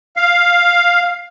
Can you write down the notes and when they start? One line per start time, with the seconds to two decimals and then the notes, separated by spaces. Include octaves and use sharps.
0.17 F5